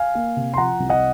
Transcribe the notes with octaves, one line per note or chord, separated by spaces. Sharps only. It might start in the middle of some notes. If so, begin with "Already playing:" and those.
Already playing: F5 G#5
A#3
C3
C6
F3 F#5 A#5
C2
D#5 F#5